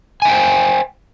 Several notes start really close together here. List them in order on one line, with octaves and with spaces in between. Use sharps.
G#5 E5 G5 C5